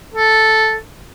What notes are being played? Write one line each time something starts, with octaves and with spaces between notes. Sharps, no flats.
A4